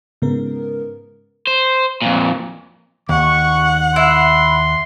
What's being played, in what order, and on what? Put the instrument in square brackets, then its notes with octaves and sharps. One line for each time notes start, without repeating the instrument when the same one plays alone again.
[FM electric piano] G#2 C#3 B3 A#4
[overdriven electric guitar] C5
F2 A#2
[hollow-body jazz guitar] D#2 [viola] F#5 [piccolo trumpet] C#6
[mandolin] E4 [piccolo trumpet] C6